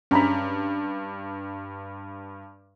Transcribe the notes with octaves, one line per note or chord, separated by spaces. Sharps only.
G2 C#4 A#5 B5